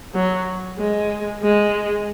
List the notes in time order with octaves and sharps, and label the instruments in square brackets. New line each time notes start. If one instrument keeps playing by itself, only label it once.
[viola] F#3
G#3
G#3